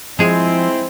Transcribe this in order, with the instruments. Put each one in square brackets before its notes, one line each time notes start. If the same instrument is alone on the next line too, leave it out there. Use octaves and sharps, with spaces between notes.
[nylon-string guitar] F3 [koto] G#3 G#4 [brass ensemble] C4 E4